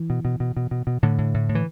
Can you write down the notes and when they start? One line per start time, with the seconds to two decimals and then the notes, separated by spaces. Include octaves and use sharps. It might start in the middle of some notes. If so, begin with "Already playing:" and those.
Already playing: E3
0.10 B2
0.25 B2
0.40 B2
0.57 B2
0.71 B2
0.87 B2
1.03 A2 D3
1.18 A2
1.34 A2
1.49 A2
1.55 E3